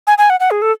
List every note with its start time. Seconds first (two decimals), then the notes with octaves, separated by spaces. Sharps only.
0.07 G#5
0.18 G#5
0.30 F#5
0.40 F#5
0.51 G#4
0.62 A4